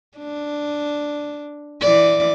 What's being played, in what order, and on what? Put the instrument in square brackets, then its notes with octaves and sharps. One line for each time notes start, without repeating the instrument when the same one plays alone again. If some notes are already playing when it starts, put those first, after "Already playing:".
[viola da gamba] D4
E3 D5